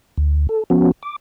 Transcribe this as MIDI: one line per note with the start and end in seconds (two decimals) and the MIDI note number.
0.18 0.47 38
0.49 0.63 69
0.70 0.91 53
0.70 0.91 59
0.70 0.91 61
0.70 0.91 66
1.03 1.16 86